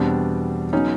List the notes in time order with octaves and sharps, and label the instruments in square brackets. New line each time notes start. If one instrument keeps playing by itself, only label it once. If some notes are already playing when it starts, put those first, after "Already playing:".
Already playing: [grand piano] E2 B2 G3 [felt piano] C4 D4
[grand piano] C#3 F#3 B3 [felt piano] C#4 D#4